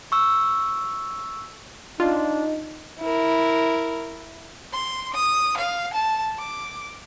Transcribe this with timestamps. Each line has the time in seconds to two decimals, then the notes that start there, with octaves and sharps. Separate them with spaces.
0.12 C#6 E6
2.00 D4 D#4 F4
3.00 E4 A#4
4.72 C6
5.14 D#6
5.57 F5
5.93 A5
6.39 D6